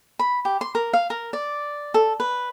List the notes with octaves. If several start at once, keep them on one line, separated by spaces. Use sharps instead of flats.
B5
G4
C6
A#4
F5
A#4
D5
A4
B4